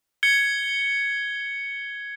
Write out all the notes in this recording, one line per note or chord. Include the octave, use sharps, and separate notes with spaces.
G#6 C#7 G7